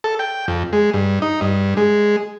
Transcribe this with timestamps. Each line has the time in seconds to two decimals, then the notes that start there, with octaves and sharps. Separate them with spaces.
0.04 A4
0.19 G5
0.48 F2
0.73 G#3
0.94 G2
1.22 D#4
1.41 G2
1.77 G#3